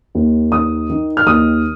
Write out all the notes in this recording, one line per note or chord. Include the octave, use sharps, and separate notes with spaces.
D#2
D#3 D#6
D#3
F6
D#2 D#6